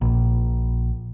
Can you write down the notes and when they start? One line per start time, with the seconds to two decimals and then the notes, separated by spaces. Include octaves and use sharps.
0.01 A#1